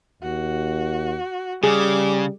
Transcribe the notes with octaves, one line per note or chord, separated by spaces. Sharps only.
D#2 F#4
C#3 G3 G#4 D6